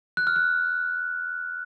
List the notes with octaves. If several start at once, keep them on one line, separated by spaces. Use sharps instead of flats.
F#6
F6
F#6